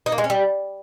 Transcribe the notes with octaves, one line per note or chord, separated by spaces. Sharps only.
D#4
A#3
G#3
C#4
G3